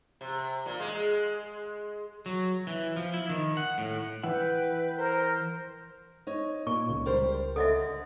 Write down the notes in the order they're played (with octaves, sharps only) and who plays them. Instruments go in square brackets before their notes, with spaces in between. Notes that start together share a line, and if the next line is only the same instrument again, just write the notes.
[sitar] C3
A#2
G#3
[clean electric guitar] F#3
E3
F3
E4
D#3
F#5
A2
[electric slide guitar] E3 E4 F#5 [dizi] B4 [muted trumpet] G5
[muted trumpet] A#4 [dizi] C5
[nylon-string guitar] D#4 C#5
[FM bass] A#2 [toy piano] C#6
[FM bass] C#2
[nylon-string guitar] G3 A#4 C5
[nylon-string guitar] D3 [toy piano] A4 D#5 E5